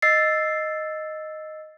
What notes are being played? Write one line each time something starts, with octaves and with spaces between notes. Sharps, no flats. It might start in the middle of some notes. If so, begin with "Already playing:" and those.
D#5 E6 A6 C7